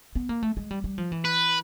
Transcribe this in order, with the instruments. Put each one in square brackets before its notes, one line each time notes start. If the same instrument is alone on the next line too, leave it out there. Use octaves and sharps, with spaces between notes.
[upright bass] B3
A#3
A3
G#3
G3
G3
F3
E3
[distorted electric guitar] B4